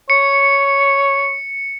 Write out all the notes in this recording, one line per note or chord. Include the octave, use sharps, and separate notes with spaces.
C#5 C#7